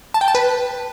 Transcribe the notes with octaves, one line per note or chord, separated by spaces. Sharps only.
A5
G5
A5
B4